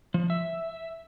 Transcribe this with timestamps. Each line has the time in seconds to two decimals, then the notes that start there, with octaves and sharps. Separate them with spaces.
0.14 F3
0.30 E5